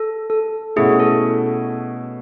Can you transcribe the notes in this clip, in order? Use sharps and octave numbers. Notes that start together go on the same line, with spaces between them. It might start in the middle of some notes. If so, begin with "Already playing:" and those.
Already playing: A4
A4
B2 A3 C#4 E4 G#4
A4